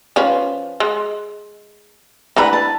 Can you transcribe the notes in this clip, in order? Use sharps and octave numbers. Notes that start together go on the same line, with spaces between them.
F3 C#4 B4
G#3
D3 E3 B4 A#5 B5
A5